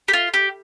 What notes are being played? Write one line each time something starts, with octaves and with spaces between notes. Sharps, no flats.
G4
F4
G4